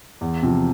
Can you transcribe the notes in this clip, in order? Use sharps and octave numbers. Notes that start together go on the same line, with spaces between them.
E2
C3 F3